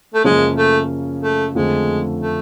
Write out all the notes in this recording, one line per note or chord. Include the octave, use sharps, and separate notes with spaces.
A3
F#2 C#3 F3 G#3 A#3 C#4
A3
A3
F2 D3 F3 G#3 A3
A3